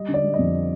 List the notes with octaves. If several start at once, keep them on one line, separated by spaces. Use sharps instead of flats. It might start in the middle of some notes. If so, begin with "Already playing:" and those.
Already playing: G3 D#5
D3
D5
G3
D#5
F2